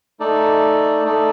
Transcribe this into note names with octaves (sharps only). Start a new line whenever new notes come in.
A3 D#4 A4 D5
A3 D#4 A4 D5